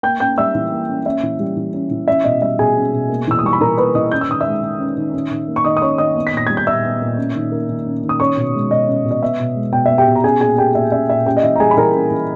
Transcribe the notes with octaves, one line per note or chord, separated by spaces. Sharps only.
A#3 G5 G6
C#4 G5 G6
G3 E5 E6
E3
A#3
C#4
C#4 E5
E3
G3
E3
C#4
E3
C#4 E5
B2 D#5
G3 E5
B2 G#4 G#5
C#4
B2
A#3
E3 E6
D#6
G3 C#6
B5
E3 A#4 A#5
A#3 B4 B5
E3 D#5 D#6
C#4 G6
E6
D#3 D#6
E5 E6
G#3
D#3
C#4
D#3
C#4
D#3
A#3
C#6
D#3 D#5 D#6
D#6
C#4 C#5 C#6
D#3 D#5 D#6
B3
B6
A#2 A#6
G3 G#6
G6
A#2 E5 E6
B3
A#2
C#4
D#3
A#3
D#3
C#4
D#3
D#6
C#4 C#5 C#6
B2
G#3
B2 D#5
C#4
B2
D#5
B3 E5
B2
G#3
B2 G5
E5
B3
G4 G5
B2
A#5
C#4 G#4 G#5
A#2 G#4 G#5
A#3 G4 G5
A#2 E5
C#4 E5
A#2 E5
C#4 G4 G5
D#5
E3 E5
A#5
G3 G#4 G#5
B5
E3 A#4 A#5
C#4
E3